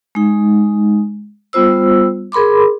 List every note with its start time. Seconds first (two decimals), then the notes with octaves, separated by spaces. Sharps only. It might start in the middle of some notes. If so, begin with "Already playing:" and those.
0.15 G#3 D#4
1.53 G3 B3 F4 C5 E6
2.32 G#4 A#4 B5 C6 D6